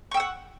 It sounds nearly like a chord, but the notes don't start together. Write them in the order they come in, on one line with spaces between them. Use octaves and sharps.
C#6 G5 E6 F#5